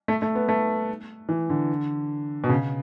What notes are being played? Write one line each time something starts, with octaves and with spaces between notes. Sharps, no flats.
A3
A3
B3
A3
E3
D3
B2
C#3